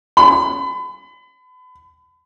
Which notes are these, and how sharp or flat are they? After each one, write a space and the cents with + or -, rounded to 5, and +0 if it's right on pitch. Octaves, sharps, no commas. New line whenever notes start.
B5 +35